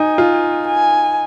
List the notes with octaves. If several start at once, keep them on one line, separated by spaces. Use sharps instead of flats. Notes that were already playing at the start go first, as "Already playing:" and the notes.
Already playing: D#4 G#5
F4
G#5